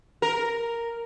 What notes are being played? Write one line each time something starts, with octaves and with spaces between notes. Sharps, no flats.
A#4